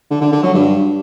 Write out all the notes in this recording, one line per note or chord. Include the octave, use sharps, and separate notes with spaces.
D3
D3
D3
F#3
G2